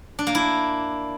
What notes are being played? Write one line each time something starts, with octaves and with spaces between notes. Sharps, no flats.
D4
A#3
E4